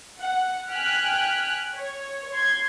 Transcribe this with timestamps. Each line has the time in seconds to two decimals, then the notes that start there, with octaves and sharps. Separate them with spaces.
0.21 F#5
0.71 G5 G#5 F6 F#6 B6
1.75 C#5
2.33 C6 G#6